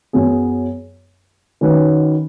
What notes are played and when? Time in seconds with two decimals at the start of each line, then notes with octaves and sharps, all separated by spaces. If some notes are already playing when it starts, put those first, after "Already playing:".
0.13 F#2 F#3 B3 G#4
1.61 D#3 F#3 C#4 B4